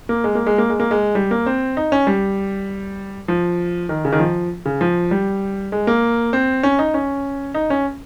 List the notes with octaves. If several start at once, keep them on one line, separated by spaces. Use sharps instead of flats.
A#3
G#3
A#3
G#3
A#3
G#3
A#3
G#3
G3
A#3
C4
D#4
C#4
G3
F3
D#3
C#3
D#3
F3
C#3
F3
G3
G#3
A#3
C4
C#4
D#4
C#4
D#4
C#4